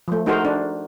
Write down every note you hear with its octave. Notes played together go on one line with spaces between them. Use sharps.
F3 A3
A3 D#4 F#4 G#4 A#4 C5
D4